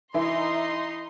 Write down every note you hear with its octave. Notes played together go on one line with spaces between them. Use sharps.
E3 D#4 E4 C6